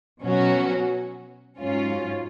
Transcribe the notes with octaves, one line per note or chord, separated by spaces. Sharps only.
B2 F#3 C#4 F#4
G#2 F#3 C#4 F4